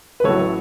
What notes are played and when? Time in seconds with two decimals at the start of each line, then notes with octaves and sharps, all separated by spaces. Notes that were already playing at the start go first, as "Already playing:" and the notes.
0.20 B4
0.24 A1 A2 F#3 A4 C#5